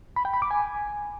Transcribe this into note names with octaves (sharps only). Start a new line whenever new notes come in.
B5
G5
B5
D6
G#5